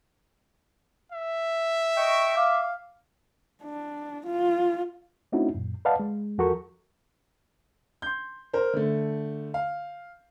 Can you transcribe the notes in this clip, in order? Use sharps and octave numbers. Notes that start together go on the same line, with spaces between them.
E5
D#5 G5 C#6
F5 D6
D4
F4
A3 C4 C#4 D#4 E4 F#4
F#2 A#2
B4 D5 D#5 F5 F#5 A5
G#3
E2 F3 F#4 A4 A#4 C#6
C6 G6
A#4 C5
D3 A3
F5